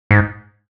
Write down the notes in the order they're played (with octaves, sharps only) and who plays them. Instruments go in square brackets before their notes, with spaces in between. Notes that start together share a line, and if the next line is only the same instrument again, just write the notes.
[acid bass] G#2